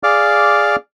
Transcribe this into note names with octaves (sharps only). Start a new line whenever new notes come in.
G#4 D5 F5 D6 F6